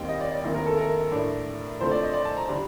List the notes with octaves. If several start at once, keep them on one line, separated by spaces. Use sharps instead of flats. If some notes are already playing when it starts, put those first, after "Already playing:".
Already playing: D#2 D#3 G3 C4 D#4 G5
D#5
D5
D5
D2 C3 D#3 A#3 D#4
A#4
A4
A#4
A2 A3 D4
F2 D3 A3 C5
D5
D#5
D5
A5
A#5
D3 G3 D4 A5